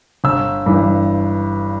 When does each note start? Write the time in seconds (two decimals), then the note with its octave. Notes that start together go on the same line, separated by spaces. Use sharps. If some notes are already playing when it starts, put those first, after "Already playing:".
0.24 G1 E6
0.66 G2 E3